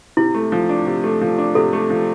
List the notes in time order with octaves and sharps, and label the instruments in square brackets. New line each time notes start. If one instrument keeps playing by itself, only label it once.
[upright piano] C3 [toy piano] E4
[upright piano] A3
F3
D4
C3
A3
F3
D4
[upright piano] C3 [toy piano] A4
[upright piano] A3
F3